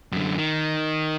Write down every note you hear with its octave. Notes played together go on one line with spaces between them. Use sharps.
F#2 D3
D#3